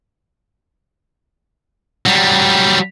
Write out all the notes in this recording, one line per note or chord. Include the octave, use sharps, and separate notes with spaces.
F#3 G3